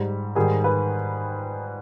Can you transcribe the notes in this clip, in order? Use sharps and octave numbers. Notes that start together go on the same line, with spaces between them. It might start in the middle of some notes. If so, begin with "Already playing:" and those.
Already playing: G#2 G3
G#2 D#3 G3 G#4
B4